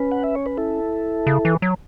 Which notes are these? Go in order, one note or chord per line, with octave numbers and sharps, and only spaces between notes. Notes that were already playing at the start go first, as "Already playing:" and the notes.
Already playing: C#4 B4
F#5
E5
C#5
B4
E4 A4
C#3
E3
F#3